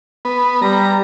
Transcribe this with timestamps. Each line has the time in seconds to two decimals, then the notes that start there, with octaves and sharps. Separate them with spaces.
0.25 B3
0.62 G3 A#5